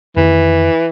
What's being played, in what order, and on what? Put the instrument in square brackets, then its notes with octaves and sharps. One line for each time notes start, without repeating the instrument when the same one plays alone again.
[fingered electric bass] F2 D#3 [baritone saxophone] E3